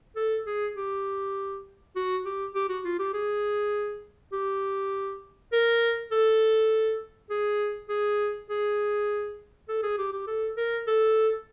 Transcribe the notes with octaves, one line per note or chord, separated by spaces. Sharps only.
A4
G#4
G4
F#4
G4
G4
F#4
F4
G4
G#4
G4
A#4
A4
G#4
G#4
G#4
A4
G#4
G4
G4
A4
A#4
A4